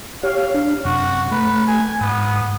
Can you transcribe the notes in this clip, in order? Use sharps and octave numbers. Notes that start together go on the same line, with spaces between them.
G4 C#5 F5
D4
F#2 C3 F#4
A3 B4
G#5
G#2 B3 D#6